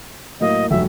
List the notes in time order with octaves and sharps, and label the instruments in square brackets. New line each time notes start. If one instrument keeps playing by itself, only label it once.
[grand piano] A2 F#3 A#3 [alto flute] D#5
[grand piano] F1 G2 F#3 [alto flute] E5